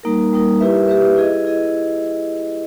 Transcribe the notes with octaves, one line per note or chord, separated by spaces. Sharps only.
G3 A#3 D#4 A#4
G3 A#3 D#4 A#4
E4 G4 B4 E5
E4 G4 B4 E5
E4 G#4 D#5
E4 G#4 D#5